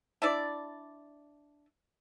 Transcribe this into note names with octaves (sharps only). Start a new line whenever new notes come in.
D4 E4 D5